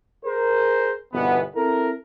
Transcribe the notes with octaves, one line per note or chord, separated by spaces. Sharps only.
G#4 A#4 C5
G1 C2 B2 E3 B3
C4 E4 A4 A#4